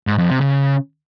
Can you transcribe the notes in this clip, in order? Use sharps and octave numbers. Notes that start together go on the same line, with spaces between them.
G#2
F2
C3
C#3